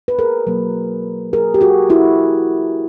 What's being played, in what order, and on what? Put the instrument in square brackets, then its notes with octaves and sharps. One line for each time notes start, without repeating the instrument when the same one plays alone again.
[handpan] B4
G#4 A#4
B2 F#3 A#3
G#4 A#4
G4
F#4 G#4
E4 F#4